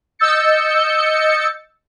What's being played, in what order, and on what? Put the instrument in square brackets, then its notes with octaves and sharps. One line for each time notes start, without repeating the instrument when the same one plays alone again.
[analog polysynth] D#5 E6 G6 A6 C#7